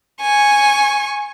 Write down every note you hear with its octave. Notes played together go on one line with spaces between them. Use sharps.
G#5 C#6